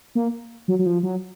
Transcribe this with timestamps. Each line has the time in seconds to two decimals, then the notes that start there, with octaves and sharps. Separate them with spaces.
0.15 A#3
0.68 F#3
0.79 F#3
0.86 F3
1.03 F#3